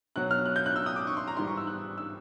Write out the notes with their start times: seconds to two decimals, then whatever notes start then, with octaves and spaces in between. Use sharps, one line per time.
0.16 B2 F#3 F#6
0.31 F6
0.46 F#6
0.56 G6
0.66 F#6
0.76 E6
0.86 D#6
0.96 D6
1.07 C#6
1.17 C6
1.27 A#5
1.37 G#2 E3 G3 C6
1.47 C#6
1.57 E6
1.67 F#6
1.98 E6